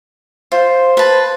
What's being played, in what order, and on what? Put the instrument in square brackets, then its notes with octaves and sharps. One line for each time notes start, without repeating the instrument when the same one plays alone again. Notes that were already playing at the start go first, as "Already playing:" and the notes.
[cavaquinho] F4 [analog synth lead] C5
[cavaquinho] B4 A5